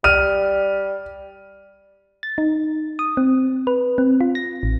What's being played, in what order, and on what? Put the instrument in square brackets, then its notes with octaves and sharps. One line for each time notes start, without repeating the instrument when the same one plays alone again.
[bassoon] G3 [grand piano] F6 D#7
[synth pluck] A6
D#4
D#6
C4
B4
C4
F4
A#6
A1